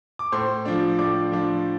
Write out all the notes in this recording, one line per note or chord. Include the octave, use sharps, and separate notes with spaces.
D6
A2 C5 C6
F3 D4
A2 D5 D6
F3 D4